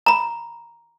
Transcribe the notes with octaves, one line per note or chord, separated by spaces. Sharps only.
A#5 B5